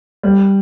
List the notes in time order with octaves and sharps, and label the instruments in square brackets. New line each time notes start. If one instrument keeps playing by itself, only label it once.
[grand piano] G3